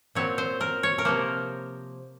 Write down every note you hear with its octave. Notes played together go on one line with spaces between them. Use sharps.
A#2 F#3 C4 C#5
C5
A#4
C#5
A#4
C3 F3 A#3 C5